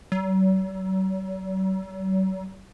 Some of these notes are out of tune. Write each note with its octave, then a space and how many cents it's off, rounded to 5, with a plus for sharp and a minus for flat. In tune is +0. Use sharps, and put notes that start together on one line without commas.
F#3 +45